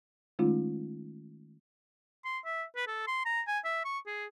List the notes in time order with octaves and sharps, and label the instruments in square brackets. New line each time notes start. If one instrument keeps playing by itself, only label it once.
[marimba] D#3 G#3 A3 C#4 D#4 F4
[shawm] C6
E5
B4
A4
C6
A#5
G#5
E5
C#6
G#4